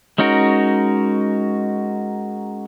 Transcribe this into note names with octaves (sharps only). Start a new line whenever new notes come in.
G#3 C#4 D#4 F#4 A#4